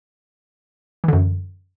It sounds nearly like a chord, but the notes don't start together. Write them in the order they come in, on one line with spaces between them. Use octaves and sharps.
E3 D3 F#2